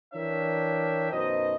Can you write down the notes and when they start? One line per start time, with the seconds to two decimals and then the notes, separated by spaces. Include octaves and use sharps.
0.14 E3 D4 A#4 C#5 E5 G5
1.11 F#2 B2 D#4 C5 D#5